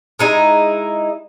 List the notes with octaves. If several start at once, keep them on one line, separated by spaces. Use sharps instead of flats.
G#3 D#4 E4